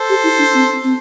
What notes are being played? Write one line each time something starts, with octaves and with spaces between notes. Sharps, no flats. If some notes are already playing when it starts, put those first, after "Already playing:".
Already playing: A4 C5
G4
E4
D4
C4
C4